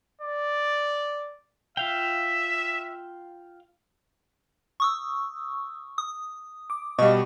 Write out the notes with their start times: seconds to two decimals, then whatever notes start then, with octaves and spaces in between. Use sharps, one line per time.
0.22 D5
1.77 F4 E5 F5 G5
4.80 C#6 D#6 E6
5.98 D#6
6.70 D6
6.99 B2 G3 D#5 F5 C#6